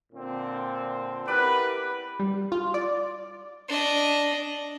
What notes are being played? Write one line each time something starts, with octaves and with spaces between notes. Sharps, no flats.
A#2 D3 C4
E4 G4 A#4 B4 D5 F#5 B5
G3
F4
D5
D4 D#5